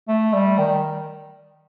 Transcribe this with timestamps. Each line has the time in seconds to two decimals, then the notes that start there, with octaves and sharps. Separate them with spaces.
0.08 A3
0.33 G3
0.58 D#3